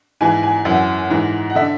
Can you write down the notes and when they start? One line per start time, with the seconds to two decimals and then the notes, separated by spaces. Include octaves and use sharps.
0.21 G#2 E3 G#5
0.43 G#5
0.65 F#2 E3 F#5
1.10 G#2 E3
1.50 F#5
1.55 D3 E5